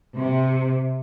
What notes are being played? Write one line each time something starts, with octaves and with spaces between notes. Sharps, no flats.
C3